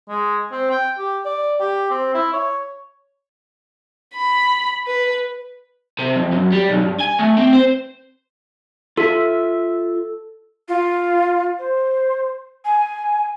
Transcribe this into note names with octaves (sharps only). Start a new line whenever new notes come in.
G#3
C4
G5
G4
D5
G4
C4
E4
C#5
B5
B4
C3
F2
F#2
G3
B1
G2
G#5
A3
C4
C5
F4 A4 E5
F4
C5
G#5